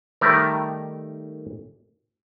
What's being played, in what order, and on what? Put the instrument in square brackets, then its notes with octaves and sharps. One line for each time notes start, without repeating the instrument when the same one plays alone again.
[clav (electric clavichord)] D#3 G3 A3 A#4 E5